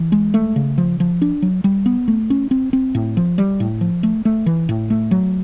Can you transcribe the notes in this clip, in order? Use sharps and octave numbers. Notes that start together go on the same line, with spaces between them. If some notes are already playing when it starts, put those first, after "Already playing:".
Already playing: E3
G#3
A3
C#3
F3
F3
D4
F#3
G3
B3
A3
C#4
C4
C4
A2
F3
G3
A2
F3
A3
A3
E3
A2
A3
F#3